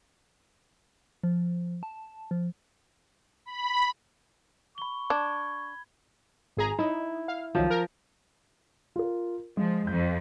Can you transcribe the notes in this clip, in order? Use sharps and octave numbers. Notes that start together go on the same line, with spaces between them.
F3
A5
F3
B5
B5 C#6 G7
D4 G#6
G#1 G#4 A#5
D#4 E4
F5
C2 D#3 F3 F#3
A#4
F4 A#4
F3 G#3
F2 G6